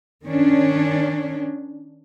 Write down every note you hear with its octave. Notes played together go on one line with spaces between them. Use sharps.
D#3 C#4 D4